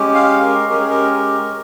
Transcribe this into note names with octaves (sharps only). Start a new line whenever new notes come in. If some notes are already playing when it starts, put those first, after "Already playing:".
Already playing: G#3 C#4 G4
F5
A#4
G#3 C#4 G4 A#4
G#4
A#4
A#4